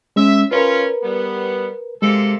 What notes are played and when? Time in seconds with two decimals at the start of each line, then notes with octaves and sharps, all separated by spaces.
0.16 G#3 C#4 E5
0.51 C#4 F4 A#4 B4
1.03 G3 B3
2.02 C3 G#3 A#3 A4